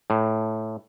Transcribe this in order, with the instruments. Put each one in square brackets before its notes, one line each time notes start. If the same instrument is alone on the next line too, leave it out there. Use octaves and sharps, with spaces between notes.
[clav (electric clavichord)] A2